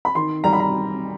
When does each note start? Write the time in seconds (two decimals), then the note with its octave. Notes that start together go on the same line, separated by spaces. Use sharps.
0.05 B5
0.15 D#3 C6
0.44 G3 A#5
0.53 B5
0.60 A#5